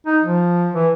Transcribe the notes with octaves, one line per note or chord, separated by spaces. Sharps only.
D#4
F3
E3